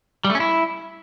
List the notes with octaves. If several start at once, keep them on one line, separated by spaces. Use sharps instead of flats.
G3
A3
C#4
E4